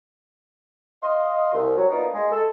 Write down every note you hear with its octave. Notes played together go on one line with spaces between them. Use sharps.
D#5 F5 C6
C2
F#3
A#3 B3 D4 D#4 F4 A#4
G#3
A4